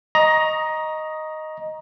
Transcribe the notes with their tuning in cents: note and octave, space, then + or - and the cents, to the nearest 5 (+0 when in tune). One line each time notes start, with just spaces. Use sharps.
D#5 +0 A#5 +15 C#6 +0